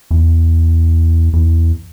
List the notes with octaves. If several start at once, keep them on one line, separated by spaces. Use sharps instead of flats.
E2
E2